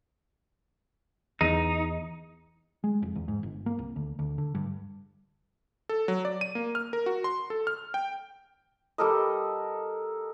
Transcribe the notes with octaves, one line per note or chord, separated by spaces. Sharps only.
E2 D#4
G#3
F1
E2
G#2
G1
A#3
C2
D2
D2
D3
G2
A4
F#3
D5
D#7
A#3
F6
A#4
F#4
C6
A4
F6
G5
G3 A4 A#4 D#5